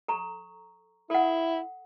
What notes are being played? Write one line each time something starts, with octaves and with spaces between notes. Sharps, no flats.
A4 A#5 C#6
E4 A4 F#5